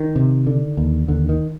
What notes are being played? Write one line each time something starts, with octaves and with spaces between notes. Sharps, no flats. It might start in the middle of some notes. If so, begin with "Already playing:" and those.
Already playing: D#3
C3
D3
D#2
D#2 D3
D#3